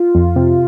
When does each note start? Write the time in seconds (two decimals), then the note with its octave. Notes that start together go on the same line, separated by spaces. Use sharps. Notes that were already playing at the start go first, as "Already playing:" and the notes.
Already playing: F4
0.15 F2
0.36 C3